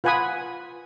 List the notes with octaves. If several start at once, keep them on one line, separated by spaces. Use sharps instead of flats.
F4 B4 F#5 G#5 B5 D#6